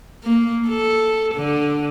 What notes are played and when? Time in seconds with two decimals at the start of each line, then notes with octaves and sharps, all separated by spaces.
0.23 A#3
0.69 A4
1.35 D3